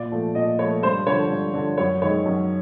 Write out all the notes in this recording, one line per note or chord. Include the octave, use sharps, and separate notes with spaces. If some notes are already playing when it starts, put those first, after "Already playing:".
Already playing: A#2 D5
F3 A3
A#2 D#5
F3 A3 C#5
G2 C5
D3 F3 C#5
G2
D3 F3
F#2 C#5
D#3 G#3 C#5
F#2